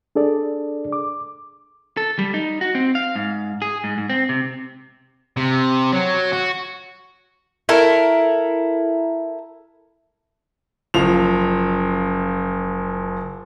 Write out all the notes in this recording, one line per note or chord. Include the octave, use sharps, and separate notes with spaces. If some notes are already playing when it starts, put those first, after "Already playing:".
D4 G#4 A4 D5
D6
A4
G3
D#4
F#4
C4
F5
G#2
G#4
G#2
G#2
C4
C3
C3
F#3
F#4
E4 A4 A#4
F#1 F3 F7